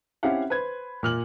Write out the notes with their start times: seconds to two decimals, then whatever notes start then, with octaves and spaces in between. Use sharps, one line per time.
0.23 C4 C#4 E4 G4 F5 F#5
0.50 B4 C5 G#6
1.03 A#2 F6 F#7